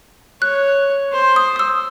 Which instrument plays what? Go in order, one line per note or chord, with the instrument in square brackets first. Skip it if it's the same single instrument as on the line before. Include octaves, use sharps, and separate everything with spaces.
[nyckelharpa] C#5 [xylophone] F#6
[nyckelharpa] C5
[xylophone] D#6
D#6
E6